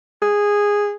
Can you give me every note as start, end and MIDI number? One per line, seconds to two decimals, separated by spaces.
0.22 0.95 68